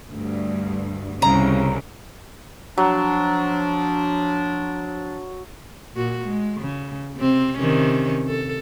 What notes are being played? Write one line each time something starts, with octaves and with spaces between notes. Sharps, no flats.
D2 G2
C2 C#3 A#5
F3 F#3 D4
A#2 F#4
G#3
C#3
C3 C4
C3 D#3 C#4
A4